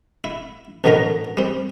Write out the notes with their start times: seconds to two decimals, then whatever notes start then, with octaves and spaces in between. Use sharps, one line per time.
0.24 E4
0.84 A1 B2 D3 F#3 A#4 A#5
1.37 G3 C4